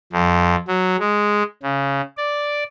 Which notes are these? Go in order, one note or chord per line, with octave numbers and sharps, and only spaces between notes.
F2
F#3
G#3
C#3
D5